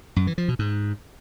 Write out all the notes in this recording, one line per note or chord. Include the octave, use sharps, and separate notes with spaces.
F#2
E3
F3
B2
G#2